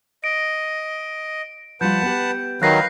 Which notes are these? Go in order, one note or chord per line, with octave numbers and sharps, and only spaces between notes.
D#5 D7
F3 G3 F4 B4 F#5 A5 G6
B3 G4
D#3 F#3 B4 F5 F#6 A#6 C7